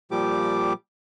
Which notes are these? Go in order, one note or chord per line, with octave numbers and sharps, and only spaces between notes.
A#2 F3 G3 G4 D6